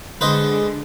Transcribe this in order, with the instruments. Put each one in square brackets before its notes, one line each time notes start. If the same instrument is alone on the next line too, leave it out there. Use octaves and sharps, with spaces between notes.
[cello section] D3 [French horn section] G#3 [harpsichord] B4 C5 D#5